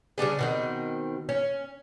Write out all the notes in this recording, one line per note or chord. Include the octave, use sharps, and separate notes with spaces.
C#3 G3 D4 G#4
B2 D#3 C4
C#4